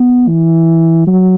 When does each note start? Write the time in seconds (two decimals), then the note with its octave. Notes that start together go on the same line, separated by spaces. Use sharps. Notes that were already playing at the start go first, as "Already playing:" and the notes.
Already playing: B3
0.28 E3
1.07 F#3